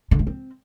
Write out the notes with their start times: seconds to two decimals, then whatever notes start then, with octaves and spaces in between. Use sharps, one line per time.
0.11 D3
0.19 A3
0.27 C4